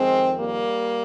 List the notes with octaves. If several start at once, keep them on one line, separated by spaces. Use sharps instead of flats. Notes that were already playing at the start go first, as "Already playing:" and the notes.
Already playing: F2 D#3 G#3 C4
G3 A#3